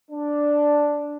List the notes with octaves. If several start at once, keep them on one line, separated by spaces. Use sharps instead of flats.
D4